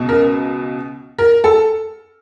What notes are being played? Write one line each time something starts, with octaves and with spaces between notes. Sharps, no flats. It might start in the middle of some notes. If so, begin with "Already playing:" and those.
Already playing: C#2 B2
A#4
A#4
A4